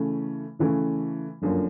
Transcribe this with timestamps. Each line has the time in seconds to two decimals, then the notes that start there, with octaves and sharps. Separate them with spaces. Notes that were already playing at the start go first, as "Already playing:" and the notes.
Already playing: C#3 E3 A3 C#4
0.59 C#3 E3 A3 C#4
1.42 G1 F#2 D3 F3 A#3